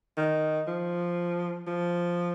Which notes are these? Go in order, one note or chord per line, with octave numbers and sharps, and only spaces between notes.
D#3
F3
F3